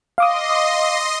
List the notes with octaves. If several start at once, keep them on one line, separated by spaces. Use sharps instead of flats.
D#5 F5 C6 D6 D#6